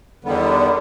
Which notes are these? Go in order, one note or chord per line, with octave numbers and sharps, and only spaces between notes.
E2 D3 D#3 G3 B3